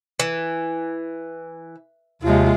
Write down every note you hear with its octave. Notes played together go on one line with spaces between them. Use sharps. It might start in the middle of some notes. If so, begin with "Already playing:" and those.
E3
D#2 C3 G#3 F4